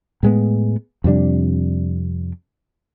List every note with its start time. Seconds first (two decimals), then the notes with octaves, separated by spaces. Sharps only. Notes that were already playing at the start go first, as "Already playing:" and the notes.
0.23 A2 G#3 B3
1.04 F2 C3 G3 D4